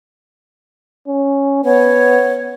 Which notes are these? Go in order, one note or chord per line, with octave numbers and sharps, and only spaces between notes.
C#4
B3 C#5